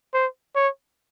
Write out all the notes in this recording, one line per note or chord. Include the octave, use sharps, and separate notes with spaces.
C5
C#5